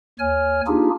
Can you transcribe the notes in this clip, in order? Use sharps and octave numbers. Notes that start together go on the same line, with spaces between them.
D#2 C#5 G#5 F6
A#3 D4 D#4 F4 G4 G#4